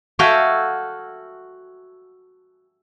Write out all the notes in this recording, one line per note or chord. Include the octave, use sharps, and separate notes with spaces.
F#4 A4 E5 F5 G5 G#5